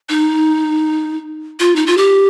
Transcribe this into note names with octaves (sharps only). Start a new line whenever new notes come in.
D#4
F4
D#4
F4
G4